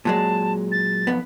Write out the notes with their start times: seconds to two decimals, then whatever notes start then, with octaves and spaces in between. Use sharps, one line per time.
0.05 A#2 F#3 G#3 A5
0.72 A6
1.07 B1 F2 B3